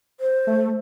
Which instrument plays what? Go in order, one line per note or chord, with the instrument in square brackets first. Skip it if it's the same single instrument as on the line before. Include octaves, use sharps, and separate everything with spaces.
[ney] C5
[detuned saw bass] A3